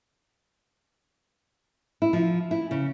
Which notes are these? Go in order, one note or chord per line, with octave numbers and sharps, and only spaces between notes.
E4
F3
E4
C#3